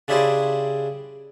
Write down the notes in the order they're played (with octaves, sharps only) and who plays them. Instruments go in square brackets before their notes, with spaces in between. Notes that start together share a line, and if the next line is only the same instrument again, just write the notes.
[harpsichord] C#3 D4 E4 G4 G#4 C5